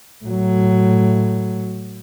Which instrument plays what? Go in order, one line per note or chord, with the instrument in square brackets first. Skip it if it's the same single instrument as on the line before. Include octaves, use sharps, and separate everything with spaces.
[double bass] A2 F#3